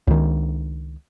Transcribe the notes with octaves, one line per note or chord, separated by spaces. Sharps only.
C#2 D#3